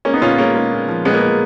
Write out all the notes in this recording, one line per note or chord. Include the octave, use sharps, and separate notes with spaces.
G#3 A#3 C#4
B3 D#4
A#2 C#4 F4
G#3 A#3 C#4
G#3
A#2
F3
A#2 G#3 B3
A#3
G#3